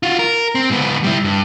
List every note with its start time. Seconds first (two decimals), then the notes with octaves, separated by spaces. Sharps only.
0.03 F4 F#4
0.19 A#4
0.55 C4
0.70 G#2 B3
1.04 G3 E4
1.24 G2